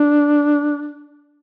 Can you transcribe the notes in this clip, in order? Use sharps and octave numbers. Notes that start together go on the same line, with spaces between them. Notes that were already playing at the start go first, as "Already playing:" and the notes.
Already playing: D4